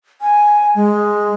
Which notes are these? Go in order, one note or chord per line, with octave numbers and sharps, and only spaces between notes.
G#5
G#3